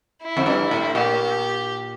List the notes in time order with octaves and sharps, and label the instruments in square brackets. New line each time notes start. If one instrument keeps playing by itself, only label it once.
[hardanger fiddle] E4
[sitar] F2
G2
A2
[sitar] A#2 [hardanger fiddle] G4